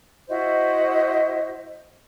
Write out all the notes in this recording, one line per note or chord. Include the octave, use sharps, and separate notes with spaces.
E4 F#4 C5 D#5